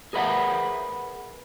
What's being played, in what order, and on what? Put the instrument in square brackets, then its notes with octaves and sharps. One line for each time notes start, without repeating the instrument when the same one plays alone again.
[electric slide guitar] G#4 A#4 B4 E5 F#5